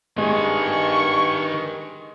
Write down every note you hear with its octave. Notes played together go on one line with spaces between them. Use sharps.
G2 D#3 G#3 G#4 C#6